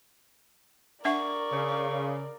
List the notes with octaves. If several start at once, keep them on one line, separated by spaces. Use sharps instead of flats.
D4 A#4 D5 E5 F#5 C#6
C#3